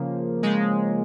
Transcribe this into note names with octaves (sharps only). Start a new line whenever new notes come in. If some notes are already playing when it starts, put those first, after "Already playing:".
Already playing: C#3 F3 A#3
C#3 F3 G#3